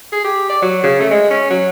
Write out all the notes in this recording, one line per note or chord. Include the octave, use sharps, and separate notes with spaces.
G#4
G4
D5
F#3
C#3
A3
G#3
C#4
F#3